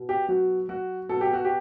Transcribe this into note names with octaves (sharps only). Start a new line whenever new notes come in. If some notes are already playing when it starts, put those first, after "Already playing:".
Already playing: B2
G4
F#3 F#4
F#3 F#4
B2 A4
G4
F#4
G4